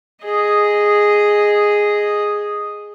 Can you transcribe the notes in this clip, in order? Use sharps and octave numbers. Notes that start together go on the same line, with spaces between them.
G#4 D#5